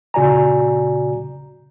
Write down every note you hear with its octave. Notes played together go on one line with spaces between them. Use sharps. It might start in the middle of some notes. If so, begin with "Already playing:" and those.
A#2 C#3 F#4 D5 G#5 A#5